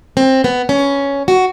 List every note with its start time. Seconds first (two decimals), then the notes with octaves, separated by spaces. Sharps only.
0.17 C4
0.44 B3
0.69 C#4
1.28 F#4